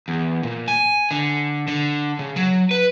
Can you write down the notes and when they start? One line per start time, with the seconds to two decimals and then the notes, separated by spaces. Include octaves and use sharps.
0.08 E2
0.43 A#2
0.68 G#5
1.11 D3
1.68 D3
2.19 C#3
2.36 F#3
2.71 B4